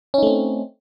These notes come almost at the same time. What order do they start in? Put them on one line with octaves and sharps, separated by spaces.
C#4 D#4 A3 C4